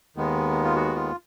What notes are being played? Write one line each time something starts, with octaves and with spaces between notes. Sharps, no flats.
D#2 D#3 G#3 B3
F4
F#4
F4